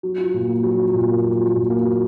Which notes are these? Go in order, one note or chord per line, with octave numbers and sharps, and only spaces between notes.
F#3
F4
A#2
A#3
F#3
F4
A#2
A#3
F#3
F4
A#2
A#3
F#3